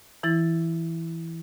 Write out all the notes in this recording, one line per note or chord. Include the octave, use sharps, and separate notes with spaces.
E3 E4 A6